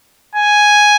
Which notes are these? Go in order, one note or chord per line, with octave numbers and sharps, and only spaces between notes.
G#5